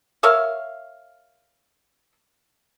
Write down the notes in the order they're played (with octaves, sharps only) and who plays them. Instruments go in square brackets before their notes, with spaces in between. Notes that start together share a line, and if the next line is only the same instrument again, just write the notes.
[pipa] A#4 C#5 E5 F5